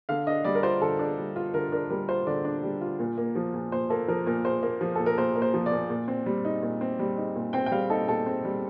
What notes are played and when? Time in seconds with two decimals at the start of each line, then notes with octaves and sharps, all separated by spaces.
0.09 D3 F5
0.27 D4 D#5
0.44 G3 D5
0.55 A#4
0.63 F4 C5
0.81 D3 A4
0.99 D4
1.18 G3
1.36 F4
1.54 D3 A#4
1.72 D4 A#4
1.90 G3 A#4
2.08 F4 C5
2.27 D3 D5
2.45 D4
2.63 G3
2.81 F4
2.99 A#2
3.17 A#3
3.35 F3
3.54 A#2
3.72 A#2 C5
3.90 A#3 A4
4.08 F3 A#4
4.26 A#2 A#4
4.45 A#2 C5
4.63 A#3
4.81 F3
4.95 A#2 A4
5.06 A#4
5.18 A#2 C5
5.36 A#3
5.42 C5
5.54 F3
5.66 D5
5.72 A#2
5.90 A#2
6.08 C4
6.26 G3
6.45 D#4
6.63 A#2
6.81 C4
6.99 G3
7.17 D#4
7.35 A#2
7.53 C4 G5
7.66 G5
7.71 G3 F5
7.90 D#4 A4
8.08 A#2 A4
8.26 C4
8.45 G3